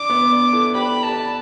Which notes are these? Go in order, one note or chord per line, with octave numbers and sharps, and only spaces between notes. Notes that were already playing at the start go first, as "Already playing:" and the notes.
Already playing: D4 D6
B3
D4
E4 A4
G4 B4 B5
A4 D5 A5